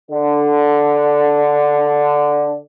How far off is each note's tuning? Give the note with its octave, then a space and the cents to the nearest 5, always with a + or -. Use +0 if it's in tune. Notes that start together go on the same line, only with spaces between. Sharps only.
D3 +0 D4 +0